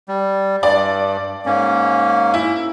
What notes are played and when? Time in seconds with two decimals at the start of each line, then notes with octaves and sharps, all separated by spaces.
0.08 G3
0.63 G2 D5
1.46 G#2 A#3 C#4
2.34 E4